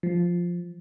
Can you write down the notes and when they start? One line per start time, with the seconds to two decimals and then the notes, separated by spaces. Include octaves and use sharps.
0.03 F3